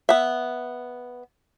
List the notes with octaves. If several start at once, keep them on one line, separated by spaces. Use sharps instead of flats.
B3 E5